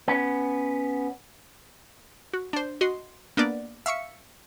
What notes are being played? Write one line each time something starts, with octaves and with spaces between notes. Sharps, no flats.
B3 C#4
F#4
D4 C5
F#4 D#5 C6
A#3 B3 D4 D5
E5 F5 C#6 C#7